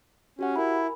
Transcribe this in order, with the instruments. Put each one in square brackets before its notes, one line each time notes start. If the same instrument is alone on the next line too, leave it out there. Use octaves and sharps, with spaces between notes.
[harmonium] C#4 [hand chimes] F#4 G4 F#5
[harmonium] E4 [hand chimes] A#4 G#5 B5